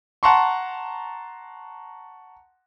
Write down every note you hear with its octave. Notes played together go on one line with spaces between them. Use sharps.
F#5 A5 A#5 C6 C#6